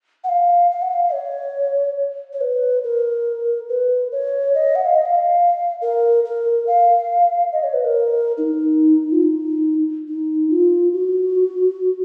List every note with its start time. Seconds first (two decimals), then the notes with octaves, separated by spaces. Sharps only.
0.24 F#5
0.29 F5
0.71 F5
0.82 F#5
0.93 F5
1.13 C#5
2.33 C#5
2.41 B4
2.84 A#4
3.69 B4
4.12 C#5
4.54 D#5
4.75 F#5
4.86 F5
4.96 D#5
5.05 F5
5.82 A#4
6.25 A#4
6.67 F5
7.52 D#5
7.63 C#5
7.74 B4
7.84 A#4
8.38 D#4
9.12 F4
9.23 D#4
10.08 D#4
10.50 F4
10.93 F#4